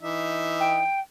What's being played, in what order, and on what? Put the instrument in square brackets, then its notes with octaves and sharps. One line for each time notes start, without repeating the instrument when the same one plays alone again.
[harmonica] E3 D#4 E5
[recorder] G5